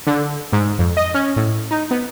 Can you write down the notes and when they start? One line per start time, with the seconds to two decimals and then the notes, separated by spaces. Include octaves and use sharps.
0.07 D3
0.53 G#2
0.79 F2
0.97 D#5
1.14 C#4
1.36 A2
1.71 D#4
1.91 B3